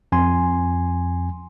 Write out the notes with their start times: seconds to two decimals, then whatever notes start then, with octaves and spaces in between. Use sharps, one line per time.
0.12 F2 G#5 C6